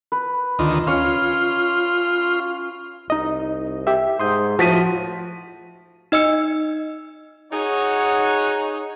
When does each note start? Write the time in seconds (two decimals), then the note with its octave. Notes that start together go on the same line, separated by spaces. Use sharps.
0.12 B4
0.59 D2 D#3 F4
0.87 C#4 F4 C#5
3.10 C2 D#4 D#5
3.87 G4 E5
4.20 G#2 C6 D#6 G6
4.59 A2 F3 F#4 B6 D#7
6.12 D#4 D#5 E6 C#7
7.52 D#4 F#4 G#4 C#5